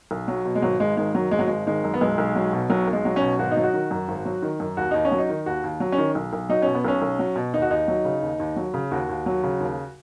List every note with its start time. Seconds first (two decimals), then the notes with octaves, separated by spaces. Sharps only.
0.11 B1
0.28 F#3
0.45 B2
0.55 G#3
0.62 G#1 F#3
0.80 G#1 G#3
0.97 D#3 G#3
1.14 F#2 F#3
1.31 G#1 G#3
1.39 F#3
1.47 G#1 G#3
1.67 D#3 G#3
1.84 F#2
1.94 B3
2.01 B1 G#3
2.18 B1
2.35 F#3
2.53 B2
2.70 B1 F#3
2.88 B1
2.93 G#3
3.05 F#3
3.16 C#4
3.21 B2
3.39 G#1 F#4
3.51 D#4
3.57 F#3
3.63 F#4
3.73 D#3
3.91 F#2
4.08 G#1
4.25 F#3
4.42 D#3
4.60 F#2
4.77 D#2 F#4
4.91 D#2 D#4
5.05 C#4
5.12 F#3
5.18 D#4
5.29 D#3
5.46 D#2 F#4
5.64 D#2
5.80 F#3
5.92 C#4
5.98 D#3
6.15 B1
6.33 B1
6.49 F#3 D#4
6.62 B2 C#4
6.75 B3
6.85 B1 C#4
7.02 B1
7.19 F#3
7.36 B2
7.54 D#2 D#4
7.62 F#4
7.71 D#2 D#4
7.88 F#3
8.05 C#3
8.22 D#2
8.40 D#2
8.56 F#3
8.74 C#3
8.91 D#2 F#4
9.09 D#2
9.26 F#3
9.43 C#3
9.60 D#2